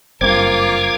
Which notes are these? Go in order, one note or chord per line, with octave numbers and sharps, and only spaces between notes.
F#1 G2 C4 F4 A#4 D6 G#6